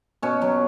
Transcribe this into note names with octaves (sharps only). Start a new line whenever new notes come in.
B2 C#4
F#3